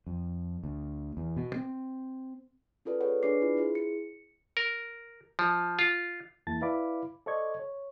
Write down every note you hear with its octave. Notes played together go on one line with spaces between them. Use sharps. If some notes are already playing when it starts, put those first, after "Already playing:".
F2
D2
E2
B2
C4
C#4 F4 A4 B4 D5
G#4 B4 C#5 F#5
D4 G#4 B4 D5 D6 C7
E4 F4
E4 G#4 C5
C#7
A#4
F3
F4
E2 A#3 E4 A5 A6
E4 B4 D5 F5 B5 D6
A4 C5 D5 D#5 C#6 G#6
C#5